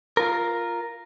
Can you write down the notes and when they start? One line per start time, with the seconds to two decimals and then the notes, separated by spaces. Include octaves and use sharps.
0.17 F4 A#4